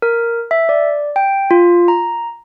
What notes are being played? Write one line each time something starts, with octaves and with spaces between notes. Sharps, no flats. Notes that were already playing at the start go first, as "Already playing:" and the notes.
A#4
E5
D5
G5
F4
A#5